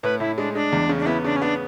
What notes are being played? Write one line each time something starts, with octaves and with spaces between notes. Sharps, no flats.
A2 B4
A2 E4
G#3 D4
G#3 D4
E2
C#3
D4
B3 E4
C#3 D4
C#4
B3 D4